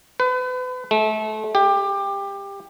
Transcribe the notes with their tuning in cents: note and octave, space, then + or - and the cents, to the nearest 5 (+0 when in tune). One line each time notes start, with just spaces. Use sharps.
B4 +35
A3 -30
G4 +20